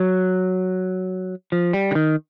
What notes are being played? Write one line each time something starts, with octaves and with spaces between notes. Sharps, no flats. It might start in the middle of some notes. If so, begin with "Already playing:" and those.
Already playing: F#3
F3
G3
D3
D#3